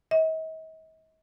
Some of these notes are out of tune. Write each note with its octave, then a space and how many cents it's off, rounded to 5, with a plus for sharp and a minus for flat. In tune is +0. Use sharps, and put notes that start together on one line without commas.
D#5 +45